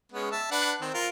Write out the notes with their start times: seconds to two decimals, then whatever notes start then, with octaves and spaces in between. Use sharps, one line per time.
0.12 G#3 B3 C#4
0.32 E5 A5
0.51 D4 B4 F#5
0.81 D#3 C4
0.94 F4 A#4